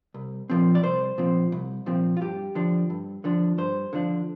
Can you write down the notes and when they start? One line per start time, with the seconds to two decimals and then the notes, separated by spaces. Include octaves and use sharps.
0.14 C2
0.50 A#2 F3 C4
0.75 D5
0.83 C2 C5
1.18 A#2 F3 C4
1.52 C2
1.86 A#2 F3 C4
2.17 F4
2.21 G2 G4
2.55 D3 F3 D4
2.90 G2
3.24 D3 F3 D4
3.58 G2 C5
3.93 D3 F3 D4